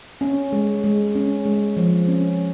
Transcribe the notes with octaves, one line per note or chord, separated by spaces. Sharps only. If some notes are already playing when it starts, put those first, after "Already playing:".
C#4
G#3
G#3
C#4
G#3
F3
C#4